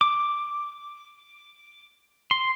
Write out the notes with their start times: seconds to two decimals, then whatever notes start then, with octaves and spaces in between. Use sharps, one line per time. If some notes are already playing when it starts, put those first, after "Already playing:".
0.01 D6
2.31 C6